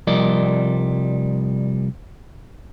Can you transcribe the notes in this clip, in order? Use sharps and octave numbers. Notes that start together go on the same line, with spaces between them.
C2 F3 G3 A#4 D5 D#5